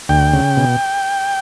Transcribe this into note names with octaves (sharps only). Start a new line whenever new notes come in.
D2 G5
C#3
B2